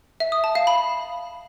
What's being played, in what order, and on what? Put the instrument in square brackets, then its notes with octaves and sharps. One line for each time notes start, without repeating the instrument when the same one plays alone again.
[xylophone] E5
D#6
A5
F5
B5